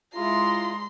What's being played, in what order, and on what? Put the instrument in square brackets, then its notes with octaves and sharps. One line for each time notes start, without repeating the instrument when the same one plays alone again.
[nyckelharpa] G#3 A#5 [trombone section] E4 [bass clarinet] F4 [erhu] C6